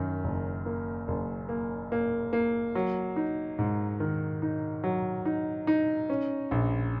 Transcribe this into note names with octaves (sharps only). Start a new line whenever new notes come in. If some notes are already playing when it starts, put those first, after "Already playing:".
Already playing: F#2 D#3
F#1
A#3
F#1
A#3
A#3
A#3
F#3
D#4
G#2
D#3
D#4
F#3
D#4
D#4
C#4
A#1